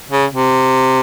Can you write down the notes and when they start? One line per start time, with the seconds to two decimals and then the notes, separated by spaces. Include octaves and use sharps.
0.11 C#3
0.31 C3